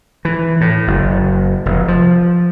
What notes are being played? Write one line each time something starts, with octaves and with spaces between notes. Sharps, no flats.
E3
A2
F#1
F1
F3